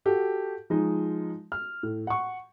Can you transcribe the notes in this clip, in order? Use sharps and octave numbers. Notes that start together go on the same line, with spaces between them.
F#4 G4 A4
F3 G#3 D#4
F6
A2
F#5 C#6